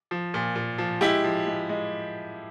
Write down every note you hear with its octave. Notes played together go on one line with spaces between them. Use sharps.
F3
A#2
A#2
F3
G#3 E4 G4
F3
G#3
G#3